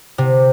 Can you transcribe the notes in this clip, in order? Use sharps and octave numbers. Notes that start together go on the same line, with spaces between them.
C3